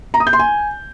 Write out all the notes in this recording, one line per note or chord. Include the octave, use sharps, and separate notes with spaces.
A#5
D#6
G6
C6
G#5